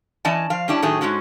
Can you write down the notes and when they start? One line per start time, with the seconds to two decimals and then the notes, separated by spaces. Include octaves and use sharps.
0.25 E3 C#4 D5 D#5 G#5 A5
0.50 F3 F5
0.68 G3 C#4 D4 E4
0.82 A2 D#3 F#3 A3 G#4
1.01 G#2 C3 G#3 C#4 F#4